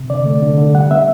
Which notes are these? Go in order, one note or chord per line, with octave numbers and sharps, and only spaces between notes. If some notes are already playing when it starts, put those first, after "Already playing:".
Already playing: C3
D3 D5
A3
D3
D3
G3 F#5
B3 E5